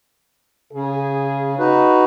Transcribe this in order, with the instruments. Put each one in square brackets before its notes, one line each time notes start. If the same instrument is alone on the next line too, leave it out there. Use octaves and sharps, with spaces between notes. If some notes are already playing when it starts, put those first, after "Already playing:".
[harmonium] C#3 [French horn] G#4
[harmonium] D#4 F#4 B4